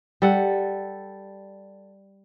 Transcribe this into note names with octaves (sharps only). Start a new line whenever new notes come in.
G3 A4 F#5